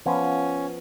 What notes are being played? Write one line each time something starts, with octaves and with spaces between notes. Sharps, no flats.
F3 B3 C#4 F4